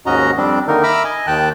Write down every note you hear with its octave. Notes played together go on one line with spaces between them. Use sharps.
D#2 G#2 C#4 F#4 D#5 A#5
F2 G3 C4 D4
D3 D#3 A#3 D#4 A#4
E5 A#5 B5 D6 E6 F6
D#5 G#5
D#2 D#3 G5 A5 F#6